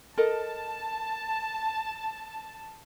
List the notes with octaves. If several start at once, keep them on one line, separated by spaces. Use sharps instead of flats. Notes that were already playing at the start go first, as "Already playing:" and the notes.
A4 A#4 D#5 A5